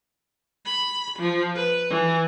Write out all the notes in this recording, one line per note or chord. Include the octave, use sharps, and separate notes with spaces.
B5
F3
B4
E3